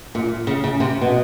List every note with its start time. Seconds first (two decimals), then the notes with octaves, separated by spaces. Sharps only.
0.15 A#2
0.47 C#3
0.64 C#3
0.80 C3
1.01 B2